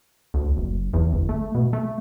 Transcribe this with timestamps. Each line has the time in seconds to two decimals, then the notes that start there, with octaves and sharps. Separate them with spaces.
0.34 D2
0.57 F#1
0.94 E2
1.13 G1
1.29 A3
1.55 B2
1.73 A3